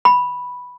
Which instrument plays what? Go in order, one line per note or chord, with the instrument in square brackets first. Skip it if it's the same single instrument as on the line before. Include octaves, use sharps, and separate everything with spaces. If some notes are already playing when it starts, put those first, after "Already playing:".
[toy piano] B5